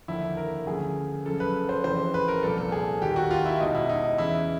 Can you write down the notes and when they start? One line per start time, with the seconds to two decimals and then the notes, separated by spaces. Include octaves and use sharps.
0.08 D#2 D3 F3 E4
0.37 A#4
0.66 D2 C#3 F3 G#4
1.26 F#2 C#3 F3 A4
1.40 B4
1.69 C5
1.84 F2 C#3 E3 C5
2.14 B4
2.28 A#4
2.43 C2 A#2 F3 A4
2.58 A4
2.72 G#4
3.02 D#2 D#3 G4
3.16 F#4
3.31 F4
3.46 E4
3.60 C#2 B2 D#4
3.75 E4
3.89 D#4
4.18 E2 C#3 E3 E4